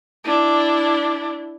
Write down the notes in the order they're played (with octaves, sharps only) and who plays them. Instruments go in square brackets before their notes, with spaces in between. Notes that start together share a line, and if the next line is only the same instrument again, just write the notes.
[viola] D4 E4